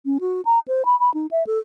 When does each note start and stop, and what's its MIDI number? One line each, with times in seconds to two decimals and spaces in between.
0.06 0.18 61
0.21 0.41 66
0.45 0.59 82
0.68 0.85 72
0.85 0.98 83
1.00 1.12 83
1.14 1.27 63
1.31 1.43 76
1.47 1.59 69